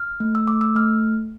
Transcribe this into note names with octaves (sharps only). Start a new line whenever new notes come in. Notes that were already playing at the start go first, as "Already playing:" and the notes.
Already playing: F6
A3
E6
A3 D6
E6
A3 F6